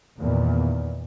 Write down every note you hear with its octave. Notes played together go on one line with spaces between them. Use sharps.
E2 A#2 D#3